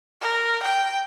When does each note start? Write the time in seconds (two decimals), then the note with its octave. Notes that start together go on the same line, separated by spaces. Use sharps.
0.21 A#4
0.63 G5